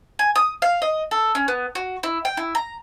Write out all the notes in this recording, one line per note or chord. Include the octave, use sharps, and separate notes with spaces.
G#5
D#6
F5
D#5
A4
C#4
B3
F#4
E4
G5
E4
A#5